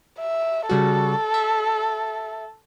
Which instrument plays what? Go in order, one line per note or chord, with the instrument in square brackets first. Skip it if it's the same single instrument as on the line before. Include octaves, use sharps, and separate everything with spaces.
[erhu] E5
[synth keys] C#3 G3 F#4 [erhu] A4
[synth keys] E5